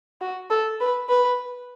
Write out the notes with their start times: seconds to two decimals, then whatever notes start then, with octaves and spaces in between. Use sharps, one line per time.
0.21 F#4
0.50 A4
0.80 B4
1.09 B4